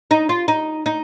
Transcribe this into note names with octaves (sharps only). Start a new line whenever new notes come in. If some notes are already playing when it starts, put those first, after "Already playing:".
D#4
F4
D#4
D#4